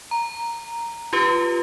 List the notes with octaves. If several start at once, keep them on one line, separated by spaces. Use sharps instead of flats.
A#5
F4 G4 B4